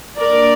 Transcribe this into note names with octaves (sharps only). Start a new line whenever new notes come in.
D#3 A#3 D4 A#4 D5